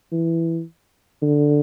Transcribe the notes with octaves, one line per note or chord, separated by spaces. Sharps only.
E3
D3